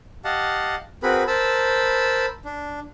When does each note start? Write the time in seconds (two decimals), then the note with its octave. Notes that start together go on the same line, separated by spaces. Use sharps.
0.25 G4 D#5 F5 F#5 A5
1.03 C4 F#4 G#4 A#4 B4 B5
1.28 A#4 C5 A5 B5 E6
2.45 D4